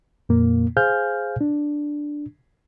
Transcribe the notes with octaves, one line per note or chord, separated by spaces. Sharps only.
F2 A#2 A#3
G#4 C5 F5 G#5 F6 G6
D4